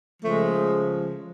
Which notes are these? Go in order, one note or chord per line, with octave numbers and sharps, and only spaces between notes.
C#3 F3 G#3 A3